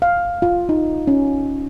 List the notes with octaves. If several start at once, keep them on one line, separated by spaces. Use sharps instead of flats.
F5
F4
D#4
C#4